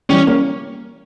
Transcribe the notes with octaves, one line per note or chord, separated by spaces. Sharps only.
E3 G3 C#4
A#3 C#4